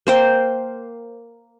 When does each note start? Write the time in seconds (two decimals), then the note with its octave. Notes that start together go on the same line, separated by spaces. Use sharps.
0.07 A#3 C5 G5